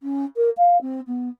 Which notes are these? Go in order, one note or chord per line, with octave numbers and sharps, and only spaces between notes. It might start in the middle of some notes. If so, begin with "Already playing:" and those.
C#4
A#4
F5
C4
B3